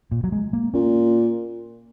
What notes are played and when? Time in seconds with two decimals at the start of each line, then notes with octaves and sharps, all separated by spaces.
0.12 A#2
0.24 F#3
0.32 G#3
0.53 A#3
0.74 A#2 C#4